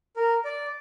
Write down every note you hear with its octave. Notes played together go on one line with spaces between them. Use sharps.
A#4
D5